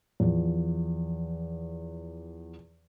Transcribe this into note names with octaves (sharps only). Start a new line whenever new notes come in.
E2 F3